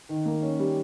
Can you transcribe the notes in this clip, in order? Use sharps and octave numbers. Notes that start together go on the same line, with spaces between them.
D#3
A#3
C#4
G3